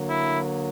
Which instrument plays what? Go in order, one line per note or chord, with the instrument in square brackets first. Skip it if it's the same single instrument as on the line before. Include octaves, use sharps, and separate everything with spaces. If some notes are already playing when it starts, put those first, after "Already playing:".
Already playing: [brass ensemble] D3 F#3 A#3
E4